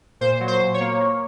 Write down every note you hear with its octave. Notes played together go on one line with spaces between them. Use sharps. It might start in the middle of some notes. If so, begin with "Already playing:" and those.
A#2 C5
F#3
C5
A#2
C#5
A#3
A#3